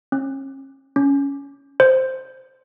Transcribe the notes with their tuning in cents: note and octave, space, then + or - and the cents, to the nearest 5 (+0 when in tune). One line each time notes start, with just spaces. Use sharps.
C#4 -40
C#4 +10
C5 +0